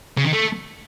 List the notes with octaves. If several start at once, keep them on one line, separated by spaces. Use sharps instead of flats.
C#3
D#3
A3